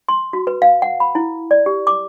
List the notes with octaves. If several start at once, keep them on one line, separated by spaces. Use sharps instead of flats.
C6
F#4
B4
F5
F#5
B5
E4
D5
G4
D6